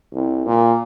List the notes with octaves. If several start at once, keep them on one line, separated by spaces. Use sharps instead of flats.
C2
A#2